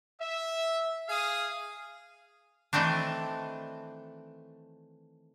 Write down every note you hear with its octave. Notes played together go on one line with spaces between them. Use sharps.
E5
G#4 F5 D#6
D#3 E3 A3 C4 D4